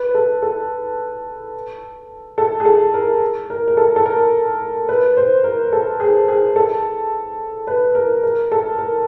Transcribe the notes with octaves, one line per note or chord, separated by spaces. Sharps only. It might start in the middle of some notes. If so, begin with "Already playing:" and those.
Already playing: B4
A4
A4
A4
G#4
A4
A#4
A#4
A#4
A4
A4
A#4
B4
C5
A#4
A4
G#4
G#4
A4
B4
A#4
A#4
A4
A#4